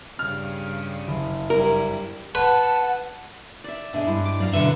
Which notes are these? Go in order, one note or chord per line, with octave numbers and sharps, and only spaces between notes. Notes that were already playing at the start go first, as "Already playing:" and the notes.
G2 C#3 G3 F6
F#1
G2 G3 E4 A#4
B4 F#5 A5
D5 E5
B2 G#3 D4 E5 G#5
G2 E4
D6
F#2 D5 F5 A#5
B1 D3 B4 E5 C#6